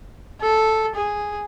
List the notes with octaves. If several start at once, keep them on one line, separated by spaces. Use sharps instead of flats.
A4
G#4